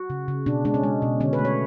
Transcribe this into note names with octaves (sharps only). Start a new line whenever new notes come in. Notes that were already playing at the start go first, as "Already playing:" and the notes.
Already playing: F#4
C#3
C#3
B2 D4
G#3 D4
C#4
G#3
B2
D3 C#4
B4
A3
C#5